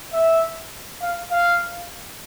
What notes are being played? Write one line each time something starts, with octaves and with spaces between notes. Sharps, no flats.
E5
F5
F5